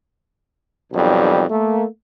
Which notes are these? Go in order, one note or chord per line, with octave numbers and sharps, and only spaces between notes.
B1 F2 D#3 G3
A3 A#3